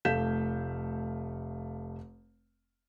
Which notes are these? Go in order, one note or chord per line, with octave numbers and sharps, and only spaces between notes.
F1 A3 F5 G6 B6 E7